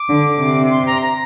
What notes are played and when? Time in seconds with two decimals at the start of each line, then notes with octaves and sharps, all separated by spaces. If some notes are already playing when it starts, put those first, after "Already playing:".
Already playing: D6
0.09 D3
0.40 C3
0.71 C6
0.86 A#5
1.02 A#5